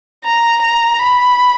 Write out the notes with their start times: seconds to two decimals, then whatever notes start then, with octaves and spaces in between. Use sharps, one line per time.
0.25 A#5
0.62 A#5
0.99 B5